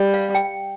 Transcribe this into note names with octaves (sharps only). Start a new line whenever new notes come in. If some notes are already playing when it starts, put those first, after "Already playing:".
Already playing: G3
F5
G5